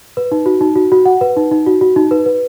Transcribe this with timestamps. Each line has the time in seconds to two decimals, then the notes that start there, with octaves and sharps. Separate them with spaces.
0.17 B4
0.32 D#4
0.46 F#4
0.61 D#4
0.76 F#4
0.92 F#4
1.06 F#5
1.21 B4
1.37 D#4
1.51 D#4
1.66 F#4
1.81 F#4
1.96 D#4
2.11 B4
2.26 B4